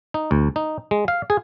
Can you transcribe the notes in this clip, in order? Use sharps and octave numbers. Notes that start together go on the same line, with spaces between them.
D#4
D2
D#4
G#3
F5
G#4